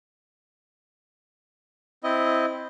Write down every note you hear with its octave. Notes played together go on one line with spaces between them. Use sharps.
C4 E4 D#5